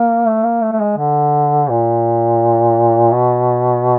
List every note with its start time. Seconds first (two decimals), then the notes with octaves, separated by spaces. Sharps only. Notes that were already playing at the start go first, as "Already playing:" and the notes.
Already playing: A#3
0.27 A3
0.44 A#3
0.62 A3
0.73 A3
0.80 G#3
0.98 D3
1.70 A#2
3.12 B2